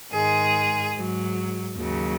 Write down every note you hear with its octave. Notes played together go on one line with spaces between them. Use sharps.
G#2 D#3 G#3 G#4
G#2 F#3
D#2 C#3 F#3